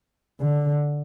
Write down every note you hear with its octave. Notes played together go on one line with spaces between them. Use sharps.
D3